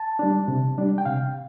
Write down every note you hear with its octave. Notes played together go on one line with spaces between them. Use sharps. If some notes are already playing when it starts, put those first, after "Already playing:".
Already playing: A5
G3 D4
C3
G3 D4
G5
C3 F5